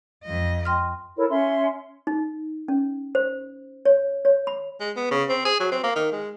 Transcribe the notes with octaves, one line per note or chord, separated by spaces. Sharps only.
F2 D#5
G5 C6 F6
E4 A4 A#4 C#5
C#4 E5 C6
D#4
C#4
C5
C#5
C#5
B5
G#3
B3
C#3
C4
G#4
F#3
C4
A#3
D#3
G#3